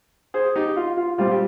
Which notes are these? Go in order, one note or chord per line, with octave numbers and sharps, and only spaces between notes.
G#4 C5
D#4 G4
F4
F4
A#2 G3 C4 F4
G4